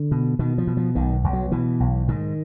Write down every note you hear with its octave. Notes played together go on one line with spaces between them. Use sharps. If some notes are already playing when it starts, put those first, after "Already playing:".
Already playing: D3
B2
B2 D#3
F3
B2
F3
B1 D#3
B1
F#3
B2 E3
B1
G#2 D#3